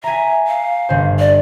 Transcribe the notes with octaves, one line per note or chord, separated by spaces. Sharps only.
E5 G#5 A#5
F5
G1 C5
D5